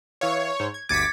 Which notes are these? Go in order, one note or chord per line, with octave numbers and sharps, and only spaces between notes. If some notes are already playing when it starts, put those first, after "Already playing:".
E3 C#5 F5 C#6
G#2 C5
G#6
G1 D2 D6 G#6 A6 B6 C#7 D#7